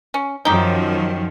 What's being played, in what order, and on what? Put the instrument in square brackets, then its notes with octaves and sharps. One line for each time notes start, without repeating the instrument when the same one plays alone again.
[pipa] C#4
[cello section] F#2 D#3 F3 [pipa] D#4 G4